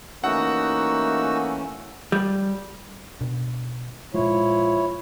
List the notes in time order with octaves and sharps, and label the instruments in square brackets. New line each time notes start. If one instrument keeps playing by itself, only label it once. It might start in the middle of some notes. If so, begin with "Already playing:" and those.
[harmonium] E3 A3 C#4 [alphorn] A#3 [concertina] D#4 F#4 E6 [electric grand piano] F#5
[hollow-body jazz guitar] G3
[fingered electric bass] B2 D4
[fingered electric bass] A#2 G#3 [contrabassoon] F3 [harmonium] E4 C#5